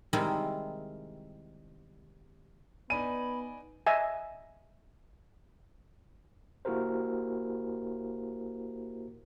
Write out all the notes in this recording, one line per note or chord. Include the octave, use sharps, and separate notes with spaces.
C3 D#3 G3 G#3 D#4 E4
B3 D#4 D5 G#5 B5 D#7
D#5 E5 G#5
A#3 E4 F#4 G4 A#4 C5